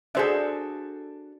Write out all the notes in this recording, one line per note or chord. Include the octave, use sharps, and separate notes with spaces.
D4 F#4 G#4 A4 C5 E5